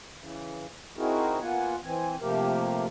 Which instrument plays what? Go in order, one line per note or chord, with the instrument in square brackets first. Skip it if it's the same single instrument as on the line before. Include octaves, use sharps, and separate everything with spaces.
[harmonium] C#3 E3
C4 D#4 E4 F#4 G#4 A#4
A#3 B3 F4 F#5 G#5
E3 C4 G#5
C3 F3 A3 A#3 G4 A#4